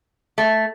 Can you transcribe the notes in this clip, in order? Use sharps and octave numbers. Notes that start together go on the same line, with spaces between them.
A3